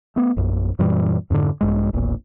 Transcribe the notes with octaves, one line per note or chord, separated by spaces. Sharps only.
A3 B3
A#1 F#2
F#2 A#2 E3 G3
F2 G#2 B2 D3
A#1 G2 G#3
E1 A#1 A#2